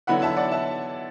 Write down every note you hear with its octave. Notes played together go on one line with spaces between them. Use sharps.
D3 F#3 B3 E4 F#5 B5
E5 A5
D5 F#5
E5 A5